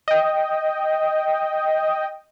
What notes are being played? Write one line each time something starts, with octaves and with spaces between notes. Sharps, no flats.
D#5 G5